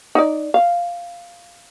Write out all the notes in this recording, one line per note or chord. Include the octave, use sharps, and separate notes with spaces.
D#4 D5
F5